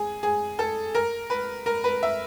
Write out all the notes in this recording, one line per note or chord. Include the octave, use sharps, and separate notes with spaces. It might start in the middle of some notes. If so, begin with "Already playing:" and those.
Already playing: G#4
G#4
A4
A#4
B4
A#4
B4
E5